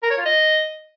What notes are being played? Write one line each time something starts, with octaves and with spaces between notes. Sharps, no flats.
A#4
C#5
F4
D#5